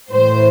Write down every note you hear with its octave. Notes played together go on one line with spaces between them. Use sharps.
A2 E3 C5